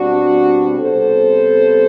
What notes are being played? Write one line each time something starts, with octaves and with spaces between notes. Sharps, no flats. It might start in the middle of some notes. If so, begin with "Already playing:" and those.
Already playing: B2 G3 C4 D4 F#4
C3 G3 B3 A4 C5